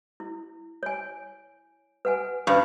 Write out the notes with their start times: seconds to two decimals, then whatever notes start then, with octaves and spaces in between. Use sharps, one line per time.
0.20 E4
0.83 C#5 G#5
2.05 B4 F#5 G#5
2.47 G2 C#4 F4 B4